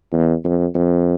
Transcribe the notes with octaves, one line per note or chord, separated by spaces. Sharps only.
E2
F2
F2